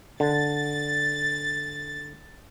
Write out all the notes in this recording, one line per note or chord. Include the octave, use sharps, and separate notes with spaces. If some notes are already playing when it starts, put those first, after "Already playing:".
D3 A6